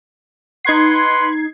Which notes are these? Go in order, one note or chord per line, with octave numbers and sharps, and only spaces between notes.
D#4 B4 F#5 C6 G#6 C7